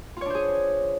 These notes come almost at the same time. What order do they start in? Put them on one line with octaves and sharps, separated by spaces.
F4 C#5 D4 C5 G#4